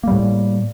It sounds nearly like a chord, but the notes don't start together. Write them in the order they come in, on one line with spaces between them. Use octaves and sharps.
A#3 G3 A2